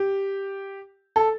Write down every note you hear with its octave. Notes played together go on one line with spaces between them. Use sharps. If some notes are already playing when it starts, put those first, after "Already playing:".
Already playing: G4
A4